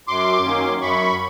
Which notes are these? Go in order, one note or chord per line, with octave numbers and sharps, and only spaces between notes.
F#2 C6 D6
D#3 F#3 A#3 C#4
F#2 B5 C#6